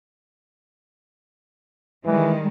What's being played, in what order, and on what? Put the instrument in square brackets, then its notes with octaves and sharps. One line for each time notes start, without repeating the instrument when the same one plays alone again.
[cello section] D#3 G3 G#3 [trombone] E3